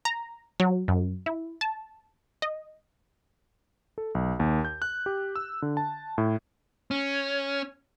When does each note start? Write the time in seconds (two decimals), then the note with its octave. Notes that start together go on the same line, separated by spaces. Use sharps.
0.05 A#5
0.60 F#3
0.88 F#2
1.26 E4
1.61 A5
2.42 D#5
3.98 A4
4.15 B1
4.40 D#2
4.65 G6
4.82 F#6
5.06 G4
5.36 E6
5.62 D3
5.77 A5
6.18 A2
6.91 C#4